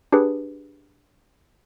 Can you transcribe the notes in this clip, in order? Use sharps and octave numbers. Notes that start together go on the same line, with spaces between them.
D4 G4 G#4 B4